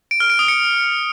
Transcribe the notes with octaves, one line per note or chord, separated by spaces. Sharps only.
D7
F6
D7
D#6
C#7